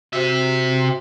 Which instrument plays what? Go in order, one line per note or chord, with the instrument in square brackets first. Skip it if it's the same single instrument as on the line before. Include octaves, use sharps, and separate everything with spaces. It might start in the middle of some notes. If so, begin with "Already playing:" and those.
[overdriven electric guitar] C3 E5 [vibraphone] F#4 G4 C5